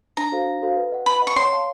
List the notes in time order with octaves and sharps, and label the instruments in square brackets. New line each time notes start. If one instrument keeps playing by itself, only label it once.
[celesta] D4 [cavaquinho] A#5
[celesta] F#4 A4 C5 F5
D4
F#4 A4 C5 F5
B4
D#5 F#5
[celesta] B4 [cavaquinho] B5
[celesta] D#5 F#5
[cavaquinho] C#6
[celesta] C#5 [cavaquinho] C6
[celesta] F5 A5